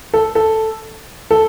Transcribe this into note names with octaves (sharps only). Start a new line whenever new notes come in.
A4
A4
A4